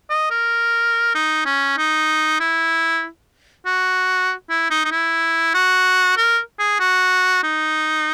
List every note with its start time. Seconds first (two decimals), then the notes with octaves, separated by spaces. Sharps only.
0.10 D#5
0.31 A#4
1.15 D#4
1.46 C#4
1.77 D#4
2.40 E4
3.66 F#4
4.50 E4
4.70 D#4
4.85 D#4
4.92 E4
5.54 F#4
6.17 A#4
6.59 G#4
6.80 F#4
7.43 D#4